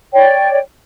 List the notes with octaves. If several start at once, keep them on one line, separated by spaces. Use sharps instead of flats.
C#5 D5 G5